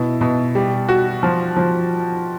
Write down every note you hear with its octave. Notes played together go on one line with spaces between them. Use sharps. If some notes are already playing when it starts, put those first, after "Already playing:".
Already playing: B2 E4
B2
G3
F#4
F3
F3